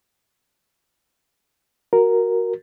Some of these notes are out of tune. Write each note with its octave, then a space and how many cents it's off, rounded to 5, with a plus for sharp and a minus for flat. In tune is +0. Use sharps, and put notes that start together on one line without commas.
F#4 +0 A#4 +0